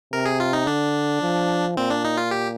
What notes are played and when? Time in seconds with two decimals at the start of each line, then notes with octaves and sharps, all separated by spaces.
0.13 C3 A#4
0.26 G#4
0.40 F4
0.53 D#4
0.67 D3 D4
1.22 F3
1.77 A#2 C4
1.90 D4
2.05 D#4
2.17 F4
2.31 G4